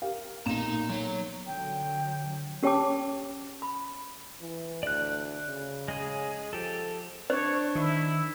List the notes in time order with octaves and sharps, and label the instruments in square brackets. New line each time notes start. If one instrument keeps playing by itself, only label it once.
[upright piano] G4 A#4 F5
[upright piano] B1 A#2 E7 [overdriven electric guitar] D#4 A#5
[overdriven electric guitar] F#3 C#5
[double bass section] D3 F#3 [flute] G5
[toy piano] C#4 G4 C#5 G5 A5 D6
B5
[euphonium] E3
[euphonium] D2 [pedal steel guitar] D5 F#6
[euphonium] C#3
[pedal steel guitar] G#3 G#4
[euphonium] F3 [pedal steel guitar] G4 A4
[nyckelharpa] D4 [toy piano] C5 [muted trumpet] C#5
[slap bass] D#3 [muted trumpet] E4